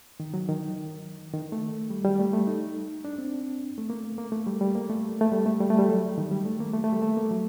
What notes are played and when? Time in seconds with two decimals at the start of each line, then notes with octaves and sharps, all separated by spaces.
0.20 D#3
0.34 F#3
0.48 D#3
1.34 D#3
1.52 A3
1.90 G3
2.05 G3
2.19 A3
2.33 A3
2.47 D#4
3.05 D4
3.18 C4
3.78 A3
3.90 A#3
4.18 A#3
4.32 A3
4.47 G3
4.61 G3
4.75 A#3
4.90 A3
5.21 A3
5.32 G3
5.46 A3
5.61 G3
5.70 A3
5.79 G3
5.88 F#3
6.18 D#3
6.31 G3
6.45 A3
6.60 A#3
6.74 A3
6.84 A3
6.92 G3
7.02 A3
7.17 A#3
7.31 F#3